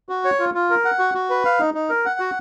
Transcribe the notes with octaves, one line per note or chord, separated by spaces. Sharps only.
F#4
C#5
F4
F4
A#4
F#5
F#4
F#4
B4
F5
D#4
D#4
A#4
F#5
F#4